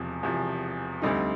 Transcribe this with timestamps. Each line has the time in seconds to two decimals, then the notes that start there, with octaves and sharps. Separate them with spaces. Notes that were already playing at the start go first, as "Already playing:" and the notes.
Already playing: E1 E2 C3 F3
0.23 E1 E2 C3 F3
1.02 D2 D3 G3 C4 D#4